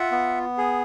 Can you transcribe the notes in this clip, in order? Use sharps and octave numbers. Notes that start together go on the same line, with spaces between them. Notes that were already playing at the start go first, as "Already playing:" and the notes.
Already playing: F4 E5 F#5
B3
G#4